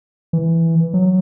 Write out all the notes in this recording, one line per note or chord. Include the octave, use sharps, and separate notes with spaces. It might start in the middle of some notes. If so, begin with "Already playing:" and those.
E3
F#3